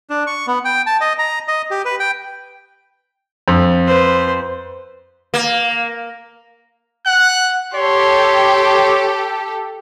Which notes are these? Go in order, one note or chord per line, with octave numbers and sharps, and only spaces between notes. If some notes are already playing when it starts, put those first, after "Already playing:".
D4
C#6
B3
G5
A5
D#5
A#5
D#5
G4
B4
G5
F2
B4 C5
A#3
F#5 F#6
G4 A4 C#5 C6